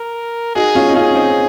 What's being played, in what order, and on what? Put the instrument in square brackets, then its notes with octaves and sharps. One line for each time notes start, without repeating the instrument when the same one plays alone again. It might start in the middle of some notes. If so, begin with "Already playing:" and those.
Already playing: [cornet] A#4
[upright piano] D#4 F#4 [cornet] G#4
[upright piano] C#4 F4
D#4
[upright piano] C#4 F4 [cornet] G#4
[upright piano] C4 D#4